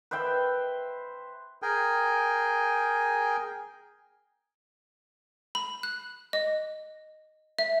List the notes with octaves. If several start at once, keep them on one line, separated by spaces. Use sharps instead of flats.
B4 C5 E5 G5
G#4 A#4 G5 G#5
B5
F#6
D#5
E5